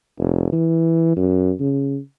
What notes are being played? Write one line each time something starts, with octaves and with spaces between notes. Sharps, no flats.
F1
E3
F#2
C#3